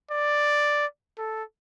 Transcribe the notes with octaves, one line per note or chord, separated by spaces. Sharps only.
D5
A4